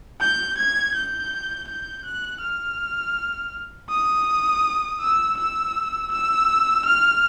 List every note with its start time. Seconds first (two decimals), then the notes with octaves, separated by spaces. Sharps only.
0.21 G6
0.58 G#6
0.95 G6
1.68 G6
2.05 F#6
2.42 F6
3.90 D#6
5.01 E6
5.37 E6
6.12 E6
6.85 F6